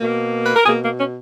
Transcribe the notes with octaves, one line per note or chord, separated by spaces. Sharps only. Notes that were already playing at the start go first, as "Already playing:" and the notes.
B2 A#3
B4
A#4
B2 A#3 G#4
A#3
C#4